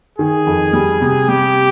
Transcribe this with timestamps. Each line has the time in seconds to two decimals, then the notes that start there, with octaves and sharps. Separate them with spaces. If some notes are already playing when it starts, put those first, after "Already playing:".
0.18 D#3 G#4
0.47 F2
0.73 G3
1.02 C3
1.28 G3 G4